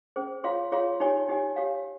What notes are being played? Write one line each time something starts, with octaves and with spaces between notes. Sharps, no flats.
C#4 G#4 C5
F4 G#4 C#5 F5 C6
F4 G#4 C#5 F5 C6
D#4 G4 C#5 G#5
D#4 G4 C#5 G#5
G4 C#5 F5